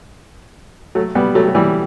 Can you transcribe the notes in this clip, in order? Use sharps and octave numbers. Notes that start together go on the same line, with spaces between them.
F#3 A3
G3 B3
F#3 A3
F#3
E3 G3